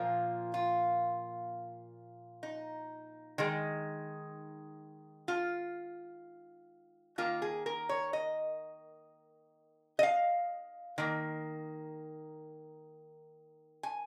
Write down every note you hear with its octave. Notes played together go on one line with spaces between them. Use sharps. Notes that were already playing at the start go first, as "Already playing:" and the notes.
Already playing: A#2 F3 A#3 F4
F4
D#4
D#3 G#3
F4
D#3 A#3 F4
G#4
A#4
C#5
D#5
D#5
F5
D#3 A#3
G#5